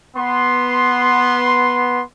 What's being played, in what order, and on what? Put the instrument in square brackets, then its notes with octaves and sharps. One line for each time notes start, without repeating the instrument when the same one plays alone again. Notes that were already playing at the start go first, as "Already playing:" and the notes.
[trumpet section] B3 C6